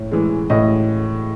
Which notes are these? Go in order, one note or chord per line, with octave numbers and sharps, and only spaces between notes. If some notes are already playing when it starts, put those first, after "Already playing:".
Already playing: A2
E3 G#3
A2 D#5